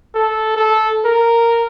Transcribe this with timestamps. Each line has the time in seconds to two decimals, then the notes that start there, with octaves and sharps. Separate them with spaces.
0.15 A4
0.56 A4
1.05 A#4